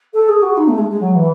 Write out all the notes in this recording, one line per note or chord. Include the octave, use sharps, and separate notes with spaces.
A4
G#4
F#4
D#4
A3
G#3
G#3
F#3
E3